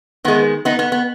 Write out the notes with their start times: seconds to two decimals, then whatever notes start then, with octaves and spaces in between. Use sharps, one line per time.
0.25 D#3 G#3 B3
0.65 B3 D#4
0.79 B3
0.92 B3